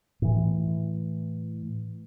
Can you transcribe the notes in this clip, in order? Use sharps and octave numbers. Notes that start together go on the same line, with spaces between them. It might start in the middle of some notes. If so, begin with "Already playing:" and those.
A2 E3